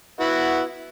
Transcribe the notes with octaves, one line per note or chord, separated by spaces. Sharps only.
B3 E4 F#4